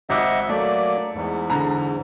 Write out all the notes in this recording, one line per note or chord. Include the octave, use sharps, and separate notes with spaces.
G#1 D#5 E5 F#5 D6
F#3 A3 A#3 D5
E2 G#2
D3 A#5